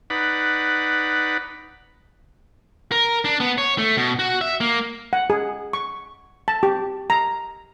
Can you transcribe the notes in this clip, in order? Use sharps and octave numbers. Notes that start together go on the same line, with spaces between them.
D#4 B4 D5 F#5 B5
A#4
D4
B3
C#5
A3
B2
F#4
E5
A#3
F#5
G#4
C#6
A5
G4
A#5